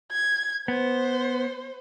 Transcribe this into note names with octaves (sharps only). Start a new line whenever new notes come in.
G#6
B3 C5